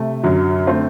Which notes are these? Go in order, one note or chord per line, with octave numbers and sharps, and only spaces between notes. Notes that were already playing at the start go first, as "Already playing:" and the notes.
Already playing: C3 A3
F#2 D3 F#3
D3 A3 C4